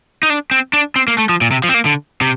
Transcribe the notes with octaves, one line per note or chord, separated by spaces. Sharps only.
D#4
D4
C4
D4
C4
A#3
A3
F3
A#2
C3
F3
C4
A#3
D3
C3